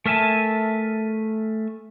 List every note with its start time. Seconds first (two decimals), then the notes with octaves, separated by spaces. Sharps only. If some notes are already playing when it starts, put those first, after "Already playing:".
0.06 A3 A#4 E5 G#5 A5